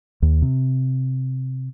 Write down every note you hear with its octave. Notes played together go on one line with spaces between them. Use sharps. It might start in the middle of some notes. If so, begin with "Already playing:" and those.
D#2
C3